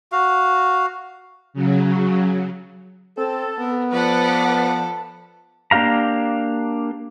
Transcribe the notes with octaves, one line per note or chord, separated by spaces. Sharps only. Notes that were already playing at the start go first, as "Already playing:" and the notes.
F#4 F5
C#3 F#3
C4 A4
B3 A#4
F3 A4 B4 D5 F#5
A#3 D4 G4 F5 A#5